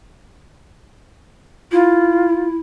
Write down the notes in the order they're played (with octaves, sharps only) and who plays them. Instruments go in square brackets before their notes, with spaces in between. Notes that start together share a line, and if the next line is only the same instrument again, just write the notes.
[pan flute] E4 [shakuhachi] F4